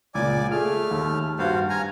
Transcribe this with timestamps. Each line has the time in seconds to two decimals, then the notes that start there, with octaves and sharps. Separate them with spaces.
0.15 C#2 A#2 D5 G#5 D6
0.51 A3 G#4 F6
0.91 D#2
1.39 G2 F#4 C5 F5
1.69 G#5 A#5 F6